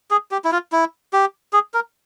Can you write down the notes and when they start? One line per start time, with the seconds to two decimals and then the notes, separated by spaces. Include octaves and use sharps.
0.11 G#4
0.31 G4
0.44 E4
0.52 F4
0.72 E4
1.13 G4
1.53 G#4
1.74 A#4